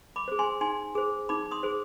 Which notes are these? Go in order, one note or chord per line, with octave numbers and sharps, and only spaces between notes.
B5 D6
G#4 C5
G#5 C6
D#4 G#5 C6
G#4 C5
D#4 B5 D6
C6 D#6
G#4 C5